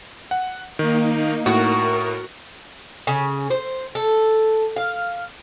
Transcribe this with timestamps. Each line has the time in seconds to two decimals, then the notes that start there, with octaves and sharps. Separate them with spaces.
0.31 F#5
0.79 D#3 A#3 D#4
1.46 A2 F#4 A#4
3.07 C#3
3.50 C5
3.95 A4
4.76 F5